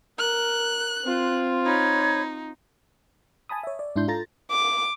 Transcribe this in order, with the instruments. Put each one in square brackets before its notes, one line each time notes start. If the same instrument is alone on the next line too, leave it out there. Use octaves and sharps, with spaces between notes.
[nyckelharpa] A#4 [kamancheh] F#6
[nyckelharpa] C4 F4
[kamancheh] D#4 [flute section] C#5 B5 G#6
[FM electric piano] G#5 A5 B5 D#6
C#5 E5
D5
G#2 D4 E4 C6 G6
F4 A4 A#5 A6 A#6
[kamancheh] D6